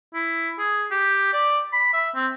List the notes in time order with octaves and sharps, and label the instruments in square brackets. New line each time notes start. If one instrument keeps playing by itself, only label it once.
[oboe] E4
G#4
G4
D5
B5
E5
C4